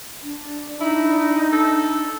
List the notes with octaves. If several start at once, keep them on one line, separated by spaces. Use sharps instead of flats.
D4
D#4 E4
A4